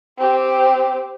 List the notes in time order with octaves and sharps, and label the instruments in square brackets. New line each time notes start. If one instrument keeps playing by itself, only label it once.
[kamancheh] C4 G4